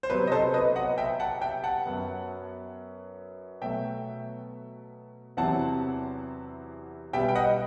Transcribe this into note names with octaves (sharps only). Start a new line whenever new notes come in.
C5
C3 F#3 B3 B4
D#5
A4 C5
B4 D#5
D#5 F#5
E5 G5
F#5 A5
E5 G5
F#5 A5
F#2 F#3 B3
B2 F#3 A3 E5 G5
E2 C3 F#3 C4 E4 F#5 A5
B2 G3 B3 E5 G5
G5
D#5 F#5